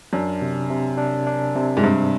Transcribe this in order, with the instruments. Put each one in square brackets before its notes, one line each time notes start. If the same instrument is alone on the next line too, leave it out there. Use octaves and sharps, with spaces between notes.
[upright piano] F#2 [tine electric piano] D4
[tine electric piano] C3
C3
D4
D4
C3
[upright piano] G#2
[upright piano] G2 [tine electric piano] C3